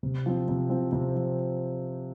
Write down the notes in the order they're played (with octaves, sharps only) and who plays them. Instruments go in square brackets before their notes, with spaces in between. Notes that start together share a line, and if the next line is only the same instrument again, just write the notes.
[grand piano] C3
F3 C4
C3
F3 C4
C3
F3